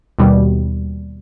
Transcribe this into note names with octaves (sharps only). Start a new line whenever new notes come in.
D#2 B2 G3